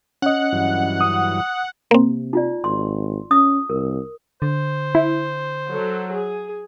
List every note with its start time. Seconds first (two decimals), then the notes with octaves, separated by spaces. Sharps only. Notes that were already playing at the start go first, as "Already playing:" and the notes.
0.22 C#4 D#5 F#5
0.52 G2 E3 F#3
1.01 D#6
1.91 C3 A#3 C4
2.33 D#4 F4 D5
2.64 G#1 C6
3.31 C#4 D#6
3.70 C2 A#4
4.42 D3 C5
4.95 E4
5.71 F#3 A4
6.13 G#4